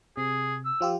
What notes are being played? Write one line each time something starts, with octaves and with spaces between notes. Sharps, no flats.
C3 G#4
E6
F3 F4 G4